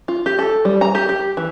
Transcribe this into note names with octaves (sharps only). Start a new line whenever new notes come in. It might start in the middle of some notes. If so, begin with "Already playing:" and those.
F4
G4
A4
G3
A#5
G4
G4
E3